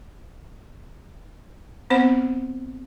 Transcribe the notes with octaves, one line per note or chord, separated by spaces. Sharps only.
B3 C4 C5 F#5 B5